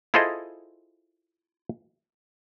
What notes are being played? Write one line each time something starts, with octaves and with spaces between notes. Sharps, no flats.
E4 F4 G#4 A4 C5 D#5